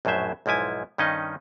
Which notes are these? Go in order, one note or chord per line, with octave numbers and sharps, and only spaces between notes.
A#1 F#2 A2 F#3 C5 E5
B1 G#2 F3 E4 G#5
G2 D#3 C#4 D#4 D#5